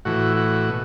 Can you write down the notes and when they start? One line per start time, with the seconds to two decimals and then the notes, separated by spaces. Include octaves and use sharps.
0.05 A2 E3 F#4
0.37 F#4
0.69 B2